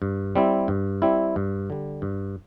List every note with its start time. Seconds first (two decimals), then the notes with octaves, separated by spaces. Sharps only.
0.02 G2
0.36 G3 C4 E4
0.68 G2
1.02 G3 C4 E4
1.36 G2
1.70 D3 G3
2.02 G2